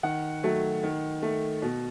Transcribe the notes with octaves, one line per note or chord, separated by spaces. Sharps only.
D#3 F#5
F#3 A3
D#3
A3
B2